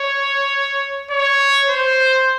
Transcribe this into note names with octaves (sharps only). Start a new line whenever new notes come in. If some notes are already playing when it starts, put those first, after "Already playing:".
Already playing: C#5
C#5
C5